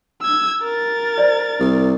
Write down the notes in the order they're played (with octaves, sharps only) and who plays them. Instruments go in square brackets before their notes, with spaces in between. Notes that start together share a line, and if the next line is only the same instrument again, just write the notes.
[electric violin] E6 G#6
A#4 A6
[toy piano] C5 D5
[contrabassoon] C2